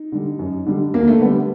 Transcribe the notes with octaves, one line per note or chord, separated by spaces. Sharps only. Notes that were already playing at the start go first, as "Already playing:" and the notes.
Already playing: D#4
D3 G3
F#2
D3 G3
D2 A#3
A3
D3 G3 B3